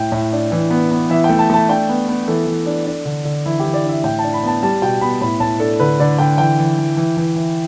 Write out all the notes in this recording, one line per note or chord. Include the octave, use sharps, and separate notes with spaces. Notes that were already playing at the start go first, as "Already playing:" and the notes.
Already playing: A2 G5
A2
D4
E3
B3
B3
E3 E5
G5
A3
A5
A3 A5
D4 G5
B3
B3
E3 A4
E3
D4
D4
D3
D3
E3 E4
E3 G4
D5
D4
E5
A2 G5
D4 A5
B5
B3 A5
G3 A5
B2 G5
B3 B5
A2 B5
A2 A5
D4 A4
D3 B4
D3 D5
D3 G5
E3 G5
E3
E3
E3
E3
E3